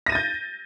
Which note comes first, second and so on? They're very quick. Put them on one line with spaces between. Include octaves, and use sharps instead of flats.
A#6 D#7 A6 G6